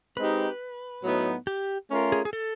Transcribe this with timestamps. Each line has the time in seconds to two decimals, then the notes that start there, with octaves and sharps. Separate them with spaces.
0.17 G#3 C4 D#4 G4 B4
1.04 A2 F#3 B3 D#4
1.47 G4
1.90 A3 C#4 F4 A#4
2.12 G#4
2.25 G#4
2.33 A4